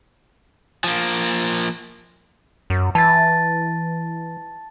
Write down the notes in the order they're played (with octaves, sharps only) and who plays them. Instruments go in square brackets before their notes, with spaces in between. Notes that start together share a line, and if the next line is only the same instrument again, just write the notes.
[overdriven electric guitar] F3 A#3
[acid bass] F#2
[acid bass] E3 [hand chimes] A5 A6